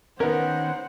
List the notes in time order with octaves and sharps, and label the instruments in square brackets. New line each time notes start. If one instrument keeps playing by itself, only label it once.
[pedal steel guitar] D#3 C#4 [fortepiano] B3 A#4 [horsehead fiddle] C5 F#5